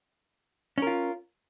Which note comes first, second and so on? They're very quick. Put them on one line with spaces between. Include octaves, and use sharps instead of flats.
C#4 A#4 F4